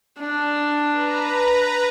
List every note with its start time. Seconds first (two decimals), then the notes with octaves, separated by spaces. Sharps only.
0.20 D4
0.91 B4 A#5